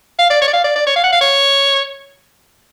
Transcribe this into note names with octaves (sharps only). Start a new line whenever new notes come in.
F5
D5
C#5
D5
F5
D5
D5
C#5
F5
F#5
F5
C#5